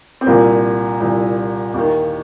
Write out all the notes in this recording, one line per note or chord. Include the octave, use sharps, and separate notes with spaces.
C4
C2 A#2 A#3
C2 A#2
D#2 D#3